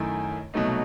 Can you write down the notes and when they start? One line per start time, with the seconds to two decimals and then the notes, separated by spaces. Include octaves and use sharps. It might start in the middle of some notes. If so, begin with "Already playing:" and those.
Already playing: F#2 D#3 A3 E4
0.54 C2 B2 F#3 A3 D#4